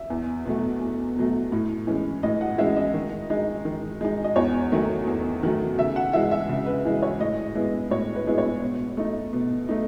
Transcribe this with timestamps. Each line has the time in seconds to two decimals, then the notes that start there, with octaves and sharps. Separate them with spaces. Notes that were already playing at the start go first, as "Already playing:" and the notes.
Already playing: E5
0.10 E2
0.46 B2 F#3 A3
0.81 E2
1.16 B2 F#3 A3
1.52 A2
1.87 E3 G#3 C#4
2.23 A2 D#5
2.41 F#5
2.58 E3 G#3 C#4 E5
2.76 D#5
2.94 D#3
3.30 G#3 D#4
3.65 D#3
4.01 G#3 D#4
4.24 D#5
4.36 E2 C#5
4.72 D#3 F#3 A3
5.07 E2
5.43 D#3 F#3 A3
5.78 C#3 E5
5.96 F#5
6.13 E3 G#3 E5
6.31 E5
6.49 C#3
6.66 B4
6.85 E3 G#3
7.02 C#5
7.20 A2 D#5
7.55 G#3 B3 E4
7.91 A2 C#5
8.15 B4
8.27 G#3 B3 E4
8.38 C#5
8.62 B2
8.97 A3 D#4
9.33 B2
9.69 A3 D#4